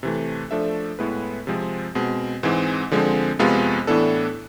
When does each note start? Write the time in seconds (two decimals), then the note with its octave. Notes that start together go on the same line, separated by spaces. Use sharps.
0.03 C3 E3 A3
0.51 F3 A3 D4 A4 E5
0.99 A2 G#3 B3 E4 B4
1.47 C3 F3 G#3 C4
1.95 B2 G#3 C4
2.43 G#2 E3 G#3 C4
2.92 D3 F3 G#3 C4
3.39 F2 C3 G#3 B3 F4
3.87 A2 E3 B3 D4 A4